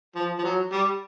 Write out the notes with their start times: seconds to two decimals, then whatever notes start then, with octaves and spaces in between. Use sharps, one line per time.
0.15 F3
0.39 F3
0.44 F#3
0.72 G3